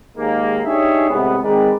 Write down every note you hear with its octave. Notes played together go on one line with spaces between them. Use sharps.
D#2 G#2 G#3 A#3
D4 D#4 G4 G#4 C#5 E5
A2 C3 G#3 B3
D#3 G#3 C4 A#4 B4 D5